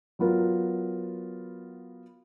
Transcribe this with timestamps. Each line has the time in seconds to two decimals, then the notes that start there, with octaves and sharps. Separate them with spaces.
0.19 F#3 B3 F4 A#4